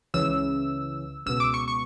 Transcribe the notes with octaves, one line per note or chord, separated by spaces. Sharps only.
C#2 C#3 E3 E6
C#2 B2 E6
D6
C#6
C#6